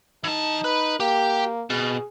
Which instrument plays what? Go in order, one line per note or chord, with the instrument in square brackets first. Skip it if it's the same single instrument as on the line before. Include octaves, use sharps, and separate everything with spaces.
[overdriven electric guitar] E3 A5 [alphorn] D#4
[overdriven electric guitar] B4
[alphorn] A#3 [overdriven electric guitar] G4
[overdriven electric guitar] B2 [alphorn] G#4